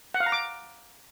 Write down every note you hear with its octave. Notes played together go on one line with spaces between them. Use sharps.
F#5
F5
A#5
D6